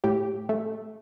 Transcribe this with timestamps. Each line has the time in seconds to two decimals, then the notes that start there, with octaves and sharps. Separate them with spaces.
0.04 A2 G4
0.49 A3